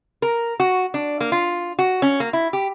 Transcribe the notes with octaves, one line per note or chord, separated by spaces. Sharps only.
A#4
F#4
D4
A#3
F4
F#4
C#4
A#3
E4
G4